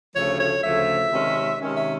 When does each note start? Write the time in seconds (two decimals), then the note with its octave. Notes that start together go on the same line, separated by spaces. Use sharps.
0.15 D2 C#3 F3 A3 C#5
0.39 C#5
0.63 D2 C#3 F3 A3 E5
1.12 C3 D#3 G#3 C#4
1.60 C3 D#3 G#3 C#4
1.76 E5